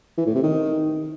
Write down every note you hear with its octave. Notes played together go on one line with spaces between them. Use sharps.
E3
A2
C3
D#3